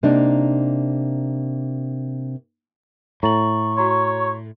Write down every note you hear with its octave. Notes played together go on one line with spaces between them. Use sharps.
C3 A#3 D4 D#4
A2 A#5 C#6 A6 F#7
F#4 C#5 A#5 C6